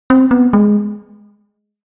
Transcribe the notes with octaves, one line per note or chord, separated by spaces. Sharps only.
C4
B3
G#3